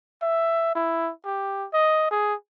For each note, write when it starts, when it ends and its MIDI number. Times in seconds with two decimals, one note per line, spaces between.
0.22 0.71 76
0.75 1.11 64
1.25 1.66 67
1.73 2.10 75
2.11 2.34 68